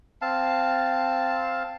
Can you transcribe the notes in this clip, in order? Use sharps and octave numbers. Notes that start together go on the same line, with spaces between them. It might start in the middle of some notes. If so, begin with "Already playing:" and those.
C4 F5 A5